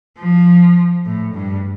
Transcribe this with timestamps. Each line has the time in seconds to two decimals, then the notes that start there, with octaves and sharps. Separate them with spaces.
0.19 F3
1.06 A2
1.34 G2